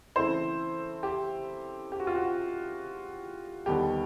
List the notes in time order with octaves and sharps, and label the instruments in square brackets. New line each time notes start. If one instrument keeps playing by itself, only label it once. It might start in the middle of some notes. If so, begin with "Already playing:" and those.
[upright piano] C#3 E3 A3 C4 E4 C5
G4
G4
F#4
F4
F#4
D#2 D3 G3 B3 D#4 G4